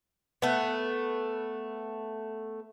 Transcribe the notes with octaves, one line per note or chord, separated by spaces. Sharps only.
A3 B3